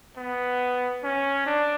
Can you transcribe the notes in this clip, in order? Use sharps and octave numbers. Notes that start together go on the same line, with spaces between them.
B3
C#4
D4